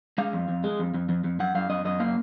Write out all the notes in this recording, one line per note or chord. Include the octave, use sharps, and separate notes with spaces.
G#3 F5
F2
F2
G#3
F2
F2
F2
F2
F#2 F#5
F#2 F5
F#2 D#5
F#2 D#5
A#3 F5